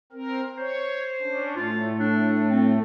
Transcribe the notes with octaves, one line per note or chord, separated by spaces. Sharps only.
C4 A#4
C5 C#5
C#4 D4
A2 A3 F4
D4
C4